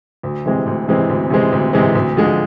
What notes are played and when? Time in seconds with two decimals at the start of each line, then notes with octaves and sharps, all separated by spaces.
0.23 D2
0.46 C3 E3 G#3 C4
0.66 D2
0.88 C3 E3 G#3 C4
1.09 D2
1.30 C3 E3 G#3 C4
1.52 D2
1.73 C3 E3 G#3 C4
1.95 D2
2.17 D3 F3 G#3